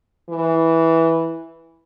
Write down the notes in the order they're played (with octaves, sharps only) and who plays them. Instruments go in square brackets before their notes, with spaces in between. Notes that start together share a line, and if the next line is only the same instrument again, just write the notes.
[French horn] E3